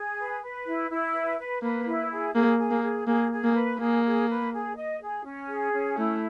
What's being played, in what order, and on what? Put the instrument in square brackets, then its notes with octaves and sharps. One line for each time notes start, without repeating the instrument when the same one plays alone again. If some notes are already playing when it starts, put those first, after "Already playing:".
Already playing: [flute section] G#4
B4
B4
E4
E4
B4
B4
[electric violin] A#3 [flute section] B4
[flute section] E4
G#4
[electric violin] A#3 [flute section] G#4
[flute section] G#4
[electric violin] A#3
[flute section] G#4
[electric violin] A#3 [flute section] G#4
[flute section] G#4
[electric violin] A#3
[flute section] B4
[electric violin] A#3 [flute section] G#4
[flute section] G#4
B4
G#4
D#5
G#4
C#4
G#4
C#4
[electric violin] A3 [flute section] E4